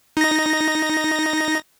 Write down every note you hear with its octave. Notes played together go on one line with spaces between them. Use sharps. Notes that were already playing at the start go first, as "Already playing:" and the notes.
D#4 A#6